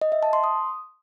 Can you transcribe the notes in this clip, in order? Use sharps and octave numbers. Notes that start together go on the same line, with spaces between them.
D#5
E5
A5
C6
D#6